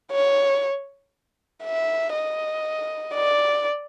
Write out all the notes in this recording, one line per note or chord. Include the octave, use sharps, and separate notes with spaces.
C#5
E5
D#5
D5